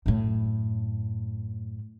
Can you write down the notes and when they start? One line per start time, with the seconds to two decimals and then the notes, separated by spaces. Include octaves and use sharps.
0.06 F#2 A2